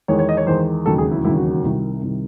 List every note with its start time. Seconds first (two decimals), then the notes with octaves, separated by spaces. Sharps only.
0.08 E2 D#3 G#3 C#5
0.19 C#5
0.29 D#5
0.37 C#5
0.47 E2 D#3 G#3 C5
0.86 E1 D#2 C#3 F#3 A4
0.98 G#4
1.11 E4
1.24 E1 D#2 C#3 F#3 E4
1.37 F#4
1.51 F#4
1.63 C2 C3 D#3
2.02 C2 C3 D#3